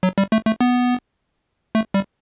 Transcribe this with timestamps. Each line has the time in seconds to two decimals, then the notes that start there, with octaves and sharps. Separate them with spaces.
0.03 F#3
0.18 G3
0.32 A3
0.46 A3
0.61 B3
1.75 A3
1.94 G3